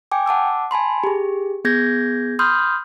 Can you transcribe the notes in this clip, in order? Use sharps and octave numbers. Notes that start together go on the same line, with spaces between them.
G5 G#5 D6
F#5 A5 D6 E6
G#5 A5 B5 C6
G4 G#4
B3 G#4 G6 G#6 A#6
B5 C6 D#6 F6 G6